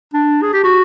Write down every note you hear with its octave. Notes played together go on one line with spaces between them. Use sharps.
D4
G#4
G4
F#4